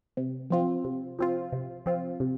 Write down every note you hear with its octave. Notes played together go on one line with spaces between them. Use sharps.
C3
F3 C4 F4
C3
F3 C4 F4
C3
F3 C4 F4
C3